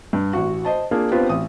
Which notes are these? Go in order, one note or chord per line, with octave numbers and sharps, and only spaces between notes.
G2
A1 F#4
C5 D#5 A5
A#3 D4 F4 G#4
B3 C4 D4 F4 G4 B4
A1 D#6